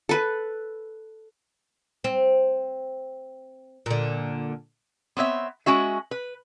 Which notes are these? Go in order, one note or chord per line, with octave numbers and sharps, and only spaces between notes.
A4 B4
C4
A#2 D3
B3 C4 C#5 E5
G#3 C#4 F#4 E5
B4